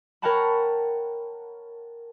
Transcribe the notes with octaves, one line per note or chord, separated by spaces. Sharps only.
A#4 C#5 F#5 G5 A5 B5